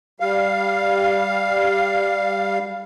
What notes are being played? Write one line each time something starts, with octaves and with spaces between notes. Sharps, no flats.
G3 F5